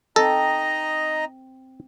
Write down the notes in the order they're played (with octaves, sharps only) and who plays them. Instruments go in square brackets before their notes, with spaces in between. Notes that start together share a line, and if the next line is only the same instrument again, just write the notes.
[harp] C4 [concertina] D#4 A#5 [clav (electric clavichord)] A4 [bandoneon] D#5